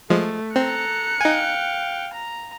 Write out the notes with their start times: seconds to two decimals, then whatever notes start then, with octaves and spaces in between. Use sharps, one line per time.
0.10 F3 G#3 A3
0.56 C4 A4 A#5 F#6 C#7
1.21 D#4 F5 G5 G#5
2.13 A#5